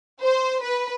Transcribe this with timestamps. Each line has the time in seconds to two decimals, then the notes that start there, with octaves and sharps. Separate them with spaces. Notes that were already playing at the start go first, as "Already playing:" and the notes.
0.22 C5
0.62 B4